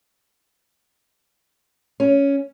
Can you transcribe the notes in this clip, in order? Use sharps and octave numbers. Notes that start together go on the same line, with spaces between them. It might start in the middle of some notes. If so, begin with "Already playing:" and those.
C#4